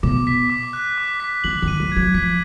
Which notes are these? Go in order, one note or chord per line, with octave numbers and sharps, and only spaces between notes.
B2 D6
B6
D6
F#6
D6
B6
D3 F#7
D#3
D#7
F#3
F#3 G#6
F3 B6